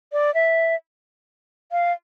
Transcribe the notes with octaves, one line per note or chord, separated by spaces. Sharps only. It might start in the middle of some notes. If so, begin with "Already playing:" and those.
D5
E5
F5